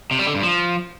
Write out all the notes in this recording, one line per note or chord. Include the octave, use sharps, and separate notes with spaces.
C3
G3
D3
G2
F3